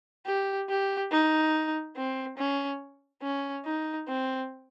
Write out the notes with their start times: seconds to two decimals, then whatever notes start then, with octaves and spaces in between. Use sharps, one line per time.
0.26 G4
0.69 G4
1.11 D#4
1.96 C4
2.38 C#4
3.22 C#4
3.65 D#4
4.08 C4